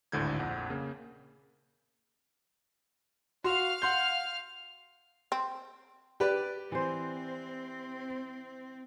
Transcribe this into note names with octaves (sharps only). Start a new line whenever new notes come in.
G#1 D2 A2 D3 G6 G#6
A#1 F2 F#5
C#3 A#3
F#4 F5 C6 F6
F#5 C6 G6
C4
G4 B4 D5
E3 C4 C5